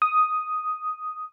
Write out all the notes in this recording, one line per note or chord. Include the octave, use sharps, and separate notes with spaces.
D#6